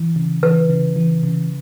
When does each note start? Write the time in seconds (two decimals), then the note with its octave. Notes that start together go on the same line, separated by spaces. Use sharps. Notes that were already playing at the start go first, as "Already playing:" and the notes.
Already playing: E3
0.16 C#3
0.43 E3 B4
0.70 C#3
0.96 E3
1.23 C#3